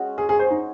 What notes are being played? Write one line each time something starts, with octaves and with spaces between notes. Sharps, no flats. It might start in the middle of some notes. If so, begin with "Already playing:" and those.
Already playing: G#3 C#4 F#4
G#4
G#4
C5
D#4